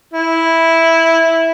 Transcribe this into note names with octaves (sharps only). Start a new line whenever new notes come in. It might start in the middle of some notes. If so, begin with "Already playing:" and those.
E4